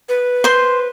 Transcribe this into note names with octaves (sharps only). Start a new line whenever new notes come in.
B4
C5 C6